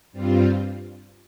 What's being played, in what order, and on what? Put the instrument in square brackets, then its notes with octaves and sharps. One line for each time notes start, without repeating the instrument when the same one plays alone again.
[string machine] G2 G3 C4 F4